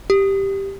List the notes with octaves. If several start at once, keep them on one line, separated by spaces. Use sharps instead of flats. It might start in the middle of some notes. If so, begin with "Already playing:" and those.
G4